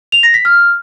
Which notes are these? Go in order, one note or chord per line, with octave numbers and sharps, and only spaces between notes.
F7
A#6
B6
F6